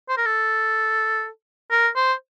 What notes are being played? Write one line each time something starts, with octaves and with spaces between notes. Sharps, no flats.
C5
A#4
A4
A#4
C5